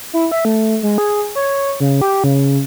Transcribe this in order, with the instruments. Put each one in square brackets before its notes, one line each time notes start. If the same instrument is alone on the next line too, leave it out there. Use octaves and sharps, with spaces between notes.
[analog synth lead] E4
E5
A3
G#3
G#4
C#5
C#3
G4
C#3